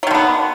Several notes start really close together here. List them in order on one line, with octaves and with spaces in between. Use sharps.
F#3 D#3 D3 B3